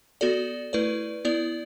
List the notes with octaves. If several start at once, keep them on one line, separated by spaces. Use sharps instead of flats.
B3 F#4 A4 D5
A3 E4 B4 D5
B3 E4 D5